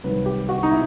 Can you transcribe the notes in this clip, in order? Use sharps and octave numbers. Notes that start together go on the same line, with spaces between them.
C2 C3 D#3 F#3 B4
G4
F#4
D#4
B2 E4